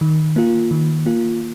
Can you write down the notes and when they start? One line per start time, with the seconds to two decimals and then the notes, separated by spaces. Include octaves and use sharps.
0.01 D#3
0.36 A#3 F4
0.71 D#3
1.06 A#3 F4